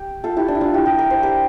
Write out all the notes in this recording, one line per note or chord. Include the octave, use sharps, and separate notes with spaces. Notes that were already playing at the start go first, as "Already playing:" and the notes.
Already playing: G4
F4 A4
E4 G4
D4
E4
D4 F4
E4 G4
G4 A#4
A#4
C5
G4 A#4